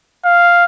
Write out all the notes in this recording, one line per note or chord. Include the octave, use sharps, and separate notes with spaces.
F5